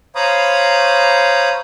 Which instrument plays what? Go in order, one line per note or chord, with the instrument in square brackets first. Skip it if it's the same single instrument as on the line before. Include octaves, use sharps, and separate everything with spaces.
[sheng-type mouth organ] C5 C#5 F5 A#5 B5 D#6